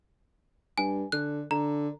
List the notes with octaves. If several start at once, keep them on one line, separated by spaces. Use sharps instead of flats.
G2 G#5
D3 F#6
D3 A#5